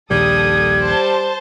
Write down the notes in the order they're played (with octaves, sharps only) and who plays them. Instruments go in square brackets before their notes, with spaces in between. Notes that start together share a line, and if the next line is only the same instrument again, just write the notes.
[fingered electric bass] A#1 D#2 [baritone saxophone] G3 [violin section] A4 D#6 [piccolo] G#6
[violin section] C5 A5